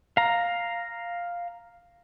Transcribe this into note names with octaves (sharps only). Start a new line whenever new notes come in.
F5 A#5